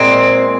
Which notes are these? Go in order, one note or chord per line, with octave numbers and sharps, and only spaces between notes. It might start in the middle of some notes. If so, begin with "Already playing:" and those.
Already playing: A#2 G#3 C4